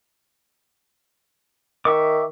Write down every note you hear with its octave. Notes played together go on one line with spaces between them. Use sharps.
D#3 E5 C#6 D6